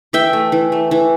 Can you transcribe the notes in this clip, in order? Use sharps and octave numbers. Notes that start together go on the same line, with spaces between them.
E3 E5 G5
A3
E3
A3
E3